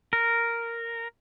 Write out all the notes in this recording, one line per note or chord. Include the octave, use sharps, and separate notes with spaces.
A#4